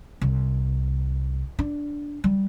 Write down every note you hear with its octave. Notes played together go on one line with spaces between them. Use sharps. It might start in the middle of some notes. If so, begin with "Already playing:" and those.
C2
D4
G3